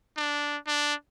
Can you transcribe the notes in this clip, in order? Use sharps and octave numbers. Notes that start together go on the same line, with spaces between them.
D4
D4